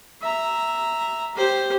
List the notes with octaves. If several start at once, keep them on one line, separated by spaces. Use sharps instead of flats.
E5 A#5
G4 C5